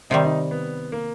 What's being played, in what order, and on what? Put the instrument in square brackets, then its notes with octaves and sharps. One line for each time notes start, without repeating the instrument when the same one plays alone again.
[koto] C3 D#3 G3 [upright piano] D#4
[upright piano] D#4
B3
A#3